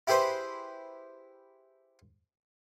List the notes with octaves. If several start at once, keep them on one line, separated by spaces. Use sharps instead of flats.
E4 G4 G#4 B4 C5